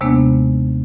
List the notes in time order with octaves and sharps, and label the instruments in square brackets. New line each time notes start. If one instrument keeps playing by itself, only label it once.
[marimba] D#2 C3 G#3 A#3 B3 D4